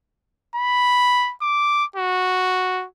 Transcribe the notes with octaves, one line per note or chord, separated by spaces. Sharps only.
B5
D6
F#4